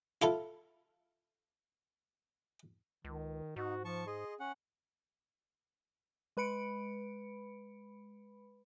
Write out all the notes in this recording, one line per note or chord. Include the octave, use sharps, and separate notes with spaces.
E4 F4 A4
C#2 D#3
G#2 D#4 F#4
F3 A5 C#6
G#4 D#5 C6
C#4 F#5
G#3 B4 B5 C#7 D7